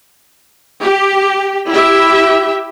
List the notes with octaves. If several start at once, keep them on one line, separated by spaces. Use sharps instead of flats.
G4
E4 G4 E5